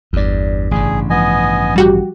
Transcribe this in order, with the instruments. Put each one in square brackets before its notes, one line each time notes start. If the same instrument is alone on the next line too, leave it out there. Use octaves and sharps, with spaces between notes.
[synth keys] G1 D5 [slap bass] E2 G2
[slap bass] A1 G2 C#3 [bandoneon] G#4
[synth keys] F3 [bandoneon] B3 D#5 G#5
[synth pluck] G3 F#4 G4